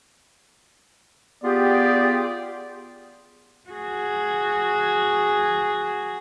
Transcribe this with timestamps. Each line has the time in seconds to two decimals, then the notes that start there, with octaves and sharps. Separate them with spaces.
1.44 B3 F4 G4 G#4 D5
3.70 F#4 G#4